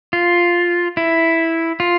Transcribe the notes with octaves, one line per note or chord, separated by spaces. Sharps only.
F4
E4
F4